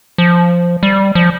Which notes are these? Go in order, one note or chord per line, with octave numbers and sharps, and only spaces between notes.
F3
G3
F3